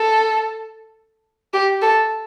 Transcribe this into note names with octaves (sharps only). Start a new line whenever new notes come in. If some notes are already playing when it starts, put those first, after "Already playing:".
Already playing: A4
G4
A4